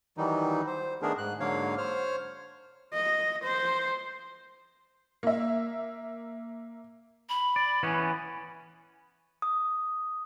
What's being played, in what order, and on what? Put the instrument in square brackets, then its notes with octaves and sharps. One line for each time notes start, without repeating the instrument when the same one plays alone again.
[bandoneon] D#3 E3 F#3 G3 D#4
C5
D#3 A3 B3 D4 G#4 A#4
G#2 F#6
G#2 D3 F#3 A#3 C#5 F5
C5 C#5 F6
[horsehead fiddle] D#5
C5
[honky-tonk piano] A#3 E5
[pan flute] B5
[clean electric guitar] D5
E3 B3 C#4
[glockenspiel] D#6